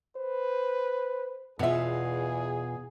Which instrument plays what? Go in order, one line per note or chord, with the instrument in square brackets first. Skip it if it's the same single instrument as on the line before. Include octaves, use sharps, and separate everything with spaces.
[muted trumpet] B4 [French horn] C5
[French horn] E2 [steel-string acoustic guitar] B2 F4 [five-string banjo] B3 E5 [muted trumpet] G#4